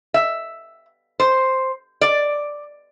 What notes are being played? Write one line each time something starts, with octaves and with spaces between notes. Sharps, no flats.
E5
C5
D5